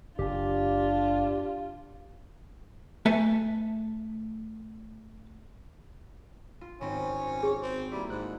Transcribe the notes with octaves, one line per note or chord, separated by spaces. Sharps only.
F#1 D4 F4 G4
A3 B4 E5 G#5 A5
F4
G#1 C4 C#4
G#4
C4
G3 A#3 E4
G#2 F#6